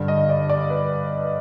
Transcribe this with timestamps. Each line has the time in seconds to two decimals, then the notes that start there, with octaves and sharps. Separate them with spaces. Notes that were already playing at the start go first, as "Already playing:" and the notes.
Already playing: G2 D3 G3 D4
0.08 D#5
0.29 D5
0.50 D5
0.70 B4